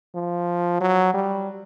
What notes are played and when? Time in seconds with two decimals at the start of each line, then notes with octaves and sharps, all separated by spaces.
0.15 F3
0.81 F#3
1.14 G3